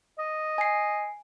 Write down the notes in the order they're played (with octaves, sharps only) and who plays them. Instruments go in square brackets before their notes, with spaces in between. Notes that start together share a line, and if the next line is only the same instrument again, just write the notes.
[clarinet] D#5
[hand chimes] G#5 C7